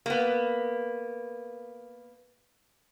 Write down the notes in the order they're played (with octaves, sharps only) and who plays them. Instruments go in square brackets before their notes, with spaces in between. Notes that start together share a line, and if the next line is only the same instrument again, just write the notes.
[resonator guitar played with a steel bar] A#3 B3